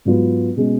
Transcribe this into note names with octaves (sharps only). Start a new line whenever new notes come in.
G#2 F#3 B3 F4
B2 G#3 C#4